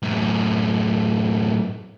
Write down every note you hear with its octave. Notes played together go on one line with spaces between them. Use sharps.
F#2 A2